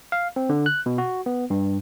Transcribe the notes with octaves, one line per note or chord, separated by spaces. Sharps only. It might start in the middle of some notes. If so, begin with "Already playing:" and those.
F5
C4
D3
F#6
B2
F#4
B3
G2